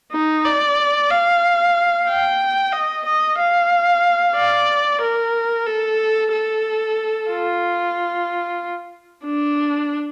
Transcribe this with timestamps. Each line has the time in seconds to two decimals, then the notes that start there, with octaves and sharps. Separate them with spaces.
0.12 D#4
0.45 D5
1.11 F5
2.08 G5
2.73 D#5
3.06 D#5
3.39 F5
4.37 D5
5.02 A#4
5.67 A4
6.32 A4
7.30 F4
9.25 D4